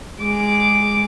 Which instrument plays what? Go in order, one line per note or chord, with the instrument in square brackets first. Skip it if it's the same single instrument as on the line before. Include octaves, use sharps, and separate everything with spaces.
[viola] G#3 D6